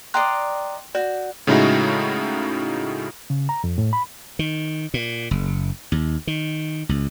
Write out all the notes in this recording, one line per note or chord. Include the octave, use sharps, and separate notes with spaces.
D5 D#5 G5 A#5 C6 F#6
F#4 D5
A2 C#3 G#3 D#4 E4 F#4
C#3
A#5
F2
A2
B5
D#3
A#2
F#1
D#2
D#3
C#2